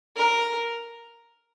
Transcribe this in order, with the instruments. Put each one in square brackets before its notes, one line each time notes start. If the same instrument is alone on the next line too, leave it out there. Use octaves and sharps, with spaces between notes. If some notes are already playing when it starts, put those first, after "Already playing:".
[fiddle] A#4